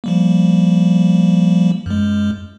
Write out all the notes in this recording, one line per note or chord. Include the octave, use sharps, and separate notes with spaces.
F3 G3 A#3
F#2 G#3